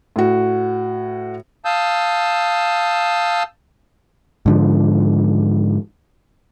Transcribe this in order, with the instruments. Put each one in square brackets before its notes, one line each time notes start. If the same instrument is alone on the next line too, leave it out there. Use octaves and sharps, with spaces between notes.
[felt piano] A2 F#4
[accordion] F5 A5 D#6 E6 G6
[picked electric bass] G#2 D3 F3